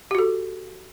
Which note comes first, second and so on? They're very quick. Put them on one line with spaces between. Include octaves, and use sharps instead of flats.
G4 F#4 A4